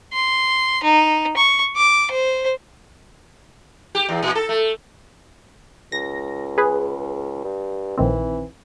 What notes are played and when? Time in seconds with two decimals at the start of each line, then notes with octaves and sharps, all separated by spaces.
0.13 C6
0.83 D#4
1.37 C#6
1.76 D6
2.11 C5
3.95 G4
4.09 E2
4.22 A#2
4.35 A4
4.49 A3
5.92 C#2 A#6
6.58 G#4 B4
7.44 G2
7.98 A#1 D#3 E3 C4